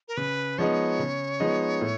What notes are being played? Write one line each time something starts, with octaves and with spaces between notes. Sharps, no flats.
A#4
C#3 B4
F3 G#3 B3 D#4 C#5
C#3
F3 G#3 B3 D#4
A2